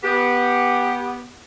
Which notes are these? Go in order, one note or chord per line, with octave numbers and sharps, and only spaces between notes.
B3 G4